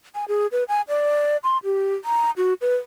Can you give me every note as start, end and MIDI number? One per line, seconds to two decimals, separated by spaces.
0.15 0.25 80
0.28 0.47 68
0.52 0.64 71
0.68 0.81 80
0.89 1.37 74
1.43 1.58 84
1.64 1.94 67
2.05 2.31 82
2.37 2.54 66
2.61 2.76 71